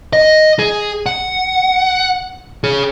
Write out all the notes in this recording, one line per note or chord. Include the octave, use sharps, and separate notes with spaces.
D#5
G#4
F#5
G#4 C#5